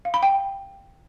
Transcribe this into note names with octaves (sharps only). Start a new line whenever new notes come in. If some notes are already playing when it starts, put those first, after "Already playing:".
F5
B5
G5